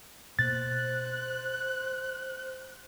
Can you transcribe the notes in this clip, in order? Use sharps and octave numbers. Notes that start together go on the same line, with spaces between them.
B2 A#3 C5 F#6 A6